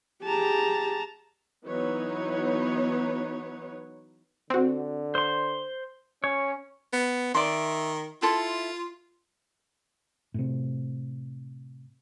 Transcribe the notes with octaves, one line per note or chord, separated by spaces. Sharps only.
G4 G#4 A5 A#5
E3 F#3 B3 D#4 B4 C#5
D3 C4 F#4
C5 C6
C#4 C#5
B3
D#3 D5 E5 C6
E4 F4 A4 C6
A2 C3